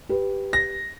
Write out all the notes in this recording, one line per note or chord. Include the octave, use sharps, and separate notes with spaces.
G4 B4
A#6